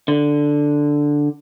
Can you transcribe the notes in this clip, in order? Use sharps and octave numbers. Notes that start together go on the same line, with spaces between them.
D3